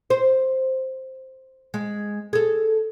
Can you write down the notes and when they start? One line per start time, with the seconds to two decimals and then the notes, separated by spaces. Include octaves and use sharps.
0.10 C5
1.74 G#3
2.33 G#4 A4